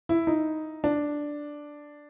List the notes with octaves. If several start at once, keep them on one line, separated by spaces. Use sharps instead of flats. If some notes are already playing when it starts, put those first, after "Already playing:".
E4
D#4
D4